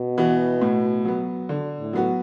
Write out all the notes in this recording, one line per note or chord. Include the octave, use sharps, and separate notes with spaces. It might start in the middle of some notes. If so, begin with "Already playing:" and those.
Already playing: B2
E3 B3 F#4
A2
F#3 B3
D3
A2
F#3 B3 F#4